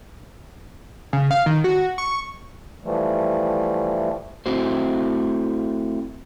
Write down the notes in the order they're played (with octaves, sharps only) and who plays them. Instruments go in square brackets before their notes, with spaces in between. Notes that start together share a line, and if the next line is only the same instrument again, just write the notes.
[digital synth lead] C#3
F5
D#3
F#4
C#6
[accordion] E3 F3 G3 A3
[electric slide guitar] A3 C4 E4 F#4 C5